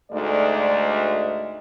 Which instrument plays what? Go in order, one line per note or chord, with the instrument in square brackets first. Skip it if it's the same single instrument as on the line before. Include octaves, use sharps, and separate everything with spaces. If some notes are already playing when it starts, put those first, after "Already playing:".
[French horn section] D2 G#2 A3 D5 D#5